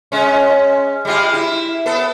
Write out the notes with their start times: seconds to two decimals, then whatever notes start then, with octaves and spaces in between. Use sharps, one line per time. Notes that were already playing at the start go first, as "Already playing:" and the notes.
0.12 G#3 C#4
1.05 G3 G#3 F4
1.33 E4
1.86 B3 A4